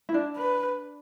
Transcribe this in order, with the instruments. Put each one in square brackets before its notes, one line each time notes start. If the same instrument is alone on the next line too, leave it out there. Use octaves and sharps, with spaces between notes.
[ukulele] E4
D4
[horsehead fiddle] B4